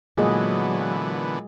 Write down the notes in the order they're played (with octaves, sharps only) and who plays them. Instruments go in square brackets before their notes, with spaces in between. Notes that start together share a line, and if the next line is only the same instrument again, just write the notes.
[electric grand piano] A#2 [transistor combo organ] D3 E3 B3 [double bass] F#3 [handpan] G#3 G#4 D#5